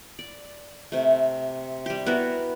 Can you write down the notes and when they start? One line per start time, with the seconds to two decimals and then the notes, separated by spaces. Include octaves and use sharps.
0.19 D5
0.92 C3 A3
1.86 G3 G4
2.06 B3 E4 F#4 A#4